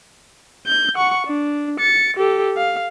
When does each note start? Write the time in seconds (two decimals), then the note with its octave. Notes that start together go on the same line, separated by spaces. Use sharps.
0.67 G6
0.95 F#5 C#6
1.27 D4
1.79 A6 C#7
2.17 G4 A4
2.57 F5